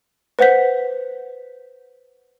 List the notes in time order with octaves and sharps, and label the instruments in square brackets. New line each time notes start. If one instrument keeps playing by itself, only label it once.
[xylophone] B4 C5 F#5 G6 B6